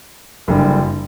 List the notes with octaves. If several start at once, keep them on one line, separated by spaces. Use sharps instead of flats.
F#1 F#2 D3 G3